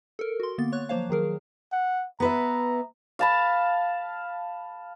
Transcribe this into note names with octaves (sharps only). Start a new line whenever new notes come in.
A4 A#4
F#4 C6
D3 A#3 B3 A6
C#5 C#6 F#6
F3 F#3 A#3 C5 C#5 F5
D#3 F#3 G#4 A#4
F#5
B3 B4 E5 A#5
F5 A5 B5